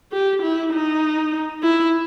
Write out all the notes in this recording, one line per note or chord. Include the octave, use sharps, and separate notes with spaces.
G4
E4
D#4
E4